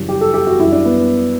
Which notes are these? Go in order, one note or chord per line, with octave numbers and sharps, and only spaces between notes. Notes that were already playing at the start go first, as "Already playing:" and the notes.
Already playing: F#2 C#3 E3 G3
G4
A4
G4
F#4
F#2 E3 G3 E4
D4
B3